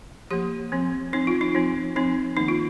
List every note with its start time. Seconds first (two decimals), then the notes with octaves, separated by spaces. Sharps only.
0.31 F3 A#3 G4
0.72 F3 C4
1.13 F3 C4 D#4
1.27 F4
1.41 D#4
1.55 F3 C4
1.96 F3 C4 D#4
2.37 D#3 A#3 D#4
2.48 F4